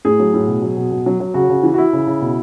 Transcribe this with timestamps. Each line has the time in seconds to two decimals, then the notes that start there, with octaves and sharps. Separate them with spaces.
0.05 A2 G#4
0.19 F#3
0.34 A2
0.48 B2
0.62 F#3
0.77 B2
0.91 B2
1.06 F#3
1.20 F#3
1.34 C#3 F#4
1.49 C#3
1.63 E3
1.74 F#4
1.78 E3 E4
1.93 C#3
2.07 C#3
2.21 B2